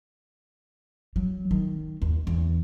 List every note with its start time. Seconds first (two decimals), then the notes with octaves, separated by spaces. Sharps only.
1.16 F#3
1.51 D#3
2.02 D#2
2.27 E2